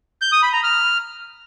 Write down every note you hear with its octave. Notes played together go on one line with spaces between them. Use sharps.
G6
D#6
B5
A#5
F6